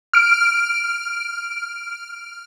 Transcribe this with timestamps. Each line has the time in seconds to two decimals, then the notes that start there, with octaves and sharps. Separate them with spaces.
0.13 F6 D7